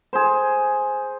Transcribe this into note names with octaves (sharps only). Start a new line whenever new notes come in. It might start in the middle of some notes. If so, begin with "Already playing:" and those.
G#4 C5